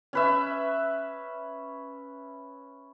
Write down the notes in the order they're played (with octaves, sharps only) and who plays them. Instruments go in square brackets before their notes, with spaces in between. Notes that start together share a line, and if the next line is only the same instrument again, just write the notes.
[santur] C#4 B4 E5